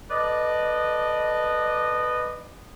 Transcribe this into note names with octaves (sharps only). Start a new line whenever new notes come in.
A4 B4 D5 D#5